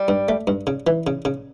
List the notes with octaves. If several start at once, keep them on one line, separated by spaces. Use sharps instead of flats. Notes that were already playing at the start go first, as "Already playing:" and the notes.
Already playing: G3
G2
A3
G2
C#3
E3
C#3
C#3